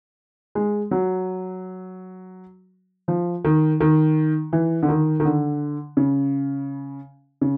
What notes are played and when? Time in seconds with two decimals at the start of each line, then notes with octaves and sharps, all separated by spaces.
0.55 G#3
0.91 F#3
3.08 F3
3.45 D#3
3.80 D#3
4.53 E3
4.83 D3
4.89 D#3
5.20 D#3
5.25 D3
5.97 C#3
7.41 C#3